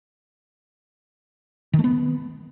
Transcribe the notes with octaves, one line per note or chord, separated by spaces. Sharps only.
D#3
A3
B3